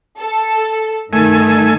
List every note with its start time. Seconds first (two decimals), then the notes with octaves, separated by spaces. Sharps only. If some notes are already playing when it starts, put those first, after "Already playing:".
0.19 A4
1.13 G2 D#3 A3 G#5